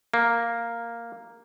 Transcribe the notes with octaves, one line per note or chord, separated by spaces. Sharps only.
A#3